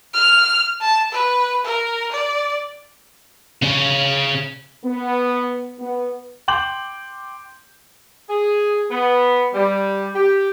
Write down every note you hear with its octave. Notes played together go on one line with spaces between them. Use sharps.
F6
A5
B4
A#4
D5
C#3 C#4
B3
B3
G5 C6 D6 G6 F#7
G#4
B3
G3
G4